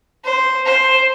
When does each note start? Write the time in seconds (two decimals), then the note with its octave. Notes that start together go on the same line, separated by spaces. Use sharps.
0.25 C5
0.66 C5